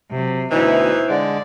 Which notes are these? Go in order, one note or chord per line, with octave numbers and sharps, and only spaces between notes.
C3 F#3
D2 B2 E3 D#4 E4 C5
D3 G#3 D5